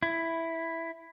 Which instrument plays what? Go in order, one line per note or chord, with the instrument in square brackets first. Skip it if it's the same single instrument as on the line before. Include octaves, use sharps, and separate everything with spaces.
[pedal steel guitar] E4